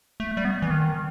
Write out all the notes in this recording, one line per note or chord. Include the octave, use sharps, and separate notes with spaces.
A3
G3
B3
E3
D#3